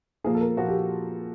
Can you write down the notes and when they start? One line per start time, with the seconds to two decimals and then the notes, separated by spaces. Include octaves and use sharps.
0.24 A#2 F3 A#3 G#4
0.35 A4
0.41 A#4
0.57 A#2 F3 A#3 F#4
0.68 G4